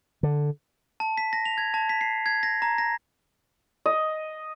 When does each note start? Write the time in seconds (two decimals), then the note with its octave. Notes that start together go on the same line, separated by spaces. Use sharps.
0.23 D3
1.00 A5
1.18 B6
1.33 A#6
1.46 F7
1.58 G#6
1.74 A5
1.89 B6
2.01 C7
2.26 G#6
2.43 A#6
2.62 A#5
2.78 A#6
3.86 D#5